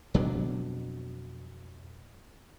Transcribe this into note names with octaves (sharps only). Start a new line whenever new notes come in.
F2 B2 F#3 D4